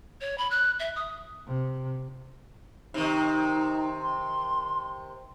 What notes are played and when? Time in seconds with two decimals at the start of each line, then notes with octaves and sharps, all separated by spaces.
0.21 C#5
0.38 B5
0.51 F#6
0.79 E5
0.96 D#6
1.47 C3
2.94 C3 D#3 D#4
4.03 C6